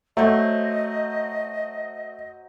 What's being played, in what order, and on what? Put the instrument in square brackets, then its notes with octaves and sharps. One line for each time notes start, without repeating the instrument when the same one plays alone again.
[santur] F#3 C5 [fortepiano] A3 [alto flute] D#5